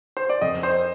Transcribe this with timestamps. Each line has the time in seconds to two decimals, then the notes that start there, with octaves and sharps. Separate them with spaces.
0.17 C5
0.29 D5
0.41 F2 D#5
0.63 C5